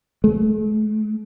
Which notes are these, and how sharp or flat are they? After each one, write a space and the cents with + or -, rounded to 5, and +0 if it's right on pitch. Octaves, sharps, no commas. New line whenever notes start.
A3 -45